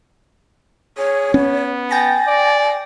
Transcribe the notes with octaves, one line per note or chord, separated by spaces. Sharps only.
G#4 C#5
B3 C#4
G5 G#5 A6 A#6
D5